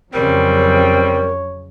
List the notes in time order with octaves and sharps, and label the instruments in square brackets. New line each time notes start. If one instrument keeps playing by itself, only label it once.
[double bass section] F2 C#3 F#3 [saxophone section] G3 C4 [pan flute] A#4 [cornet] C#5